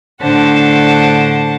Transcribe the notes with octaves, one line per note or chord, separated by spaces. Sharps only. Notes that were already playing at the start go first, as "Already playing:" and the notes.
A2 D3 D4 C5 F#5 A5